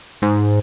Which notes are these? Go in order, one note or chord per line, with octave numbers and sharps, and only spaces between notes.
G#2